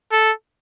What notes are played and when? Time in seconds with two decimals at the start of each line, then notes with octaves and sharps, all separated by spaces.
0.12 A4